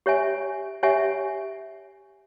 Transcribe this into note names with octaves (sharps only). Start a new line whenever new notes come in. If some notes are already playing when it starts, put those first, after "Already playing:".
G4 C#5 E5 G#5
G4 C#5 E5 G#5